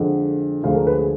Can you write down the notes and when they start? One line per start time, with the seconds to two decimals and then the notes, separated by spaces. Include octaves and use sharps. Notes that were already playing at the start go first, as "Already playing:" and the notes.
Already playing: F2 D3 G#3 F#5
0.63 D2 D3 F3 G#3 F5
0.75 A#4
0.87 B4
0.99 G#4